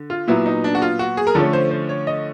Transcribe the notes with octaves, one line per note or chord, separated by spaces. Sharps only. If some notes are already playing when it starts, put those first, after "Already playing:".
Already playing: D3
F4
A#2 F#3 B3 E4
D#4
D4
F#4
F4
F#4
G#4
A#4
D3 F3 A3 C#4 A4
C5
C5
C#5
D#5